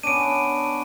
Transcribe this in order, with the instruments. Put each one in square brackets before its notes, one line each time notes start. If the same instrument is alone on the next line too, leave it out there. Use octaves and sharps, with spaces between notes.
[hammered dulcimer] B3 C#4 D4 [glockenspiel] D7 D#7